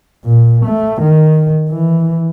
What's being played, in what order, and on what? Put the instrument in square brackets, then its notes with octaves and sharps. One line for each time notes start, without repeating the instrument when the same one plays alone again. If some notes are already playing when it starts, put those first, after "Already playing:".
[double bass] A#2
A3
D#3
E3